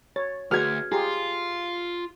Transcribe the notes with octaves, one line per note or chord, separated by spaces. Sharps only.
C#5 A6
D2 F#4 G#4 B4 F6 G#6
F4 G4 G#4 G#5 A#5 C6